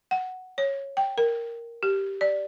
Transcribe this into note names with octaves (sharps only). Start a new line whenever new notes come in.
F#5
C#5
G5
A#4
G4
D5